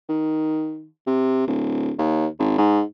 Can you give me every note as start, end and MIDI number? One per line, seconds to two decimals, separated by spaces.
0.09 0.86 51
1.07 1.47 48
1.47 1.92 26
1.99 2.26 39
2.39 2.55 32
2.58 2.82 44